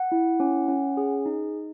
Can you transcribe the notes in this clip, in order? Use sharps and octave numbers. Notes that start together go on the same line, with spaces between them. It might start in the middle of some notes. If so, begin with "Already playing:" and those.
Already playing: F#5
E4
C#4
C#4
G#4
D#4